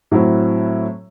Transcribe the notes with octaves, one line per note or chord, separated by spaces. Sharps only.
A2 F#3 C4 E4